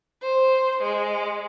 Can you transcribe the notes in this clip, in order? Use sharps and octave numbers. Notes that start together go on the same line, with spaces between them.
C5
G#3